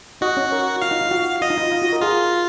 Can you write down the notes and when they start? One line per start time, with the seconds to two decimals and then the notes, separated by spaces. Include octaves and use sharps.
0.21 D#4 F#4 D#5
0.37 C#4 C#5
0.52 A#4
0.82 F4 F5
0.91 D#4
1.01 F4
1.11 F#4
1.42 F4 D#5
1.50 D#4
1.58 F4
1.71 F4
1.82 F#4
1.93 A#4
2.01 F4 G#4